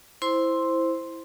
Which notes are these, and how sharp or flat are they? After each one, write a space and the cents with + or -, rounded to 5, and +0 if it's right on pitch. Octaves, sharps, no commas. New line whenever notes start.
E4 +0 C5 +0 C6 +0